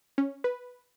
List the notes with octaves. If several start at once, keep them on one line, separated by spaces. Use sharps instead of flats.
C#4
B4